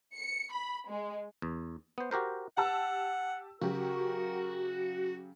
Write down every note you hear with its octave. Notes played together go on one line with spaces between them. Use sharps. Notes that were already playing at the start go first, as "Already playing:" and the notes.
C#7
B5
G#3
E2
B3 C5
F#4 G4 A#4 C5
G4 F#5 A5 E6
C#3 F#3 F#4 G4 A#4